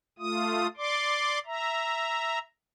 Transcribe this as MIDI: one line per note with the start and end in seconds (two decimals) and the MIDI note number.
0.19 0.67 57
0.19 0.67 65
0.19 0.67 87
0.77 1.39 74
0.77 1.39 84
0.77 1.39 86
1.46 2.39 76
1.46 2.39 82